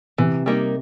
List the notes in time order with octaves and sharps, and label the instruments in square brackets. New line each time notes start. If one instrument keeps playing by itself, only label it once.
[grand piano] C3 [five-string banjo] E3
[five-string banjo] G3 A#3 D#4